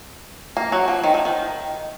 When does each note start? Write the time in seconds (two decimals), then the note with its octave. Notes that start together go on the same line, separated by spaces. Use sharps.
0.57 A#3
0.72 F#3
0.88 F3
1.04 D#3
1.14 F3
1.25 D#3